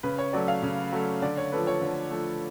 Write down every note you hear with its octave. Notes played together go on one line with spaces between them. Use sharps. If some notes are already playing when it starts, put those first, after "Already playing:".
C#3 B4
C#5
F#3 A3 D5
F5
C#3
F#3 A3
D3 D5
C#5
F3 A3 B4
C#5
D3
F3 A3